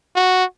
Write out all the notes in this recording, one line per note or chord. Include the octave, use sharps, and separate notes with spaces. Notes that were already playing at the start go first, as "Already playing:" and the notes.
F#4